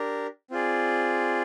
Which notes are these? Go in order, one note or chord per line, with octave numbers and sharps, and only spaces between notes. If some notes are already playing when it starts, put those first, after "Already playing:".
Already playing: D4 G4 A#4
C4 F4 G#4 D5